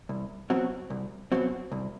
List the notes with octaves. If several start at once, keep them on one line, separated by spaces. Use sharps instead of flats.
C2
B2 F#3 C4 F#4
C2
B2 F#3 C4 F#4
C2